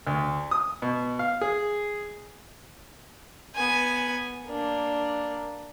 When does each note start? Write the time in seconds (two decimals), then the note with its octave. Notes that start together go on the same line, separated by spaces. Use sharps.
0.07 D2
0.51 D#6
0.82 B2
1.19 F5
1.41 G#4
3.56 B3 G#5
4.47 A#3 D4